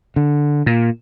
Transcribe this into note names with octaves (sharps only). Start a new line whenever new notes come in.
D3
A#2